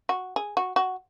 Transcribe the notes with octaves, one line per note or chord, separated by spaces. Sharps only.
F#4
G#4
F#4
F#4